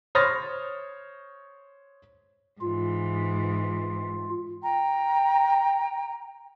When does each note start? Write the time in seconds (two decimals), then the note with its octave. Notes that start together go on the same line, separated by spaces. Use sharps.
0.15 C5 C#5 D#6 F6 A6 A#6
2.61 G#2 E3 F4
4.62 G5 A#5